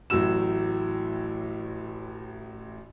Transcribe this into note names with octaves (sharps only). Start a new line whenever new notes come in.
A1 A2 F#3 F#4 E6 E7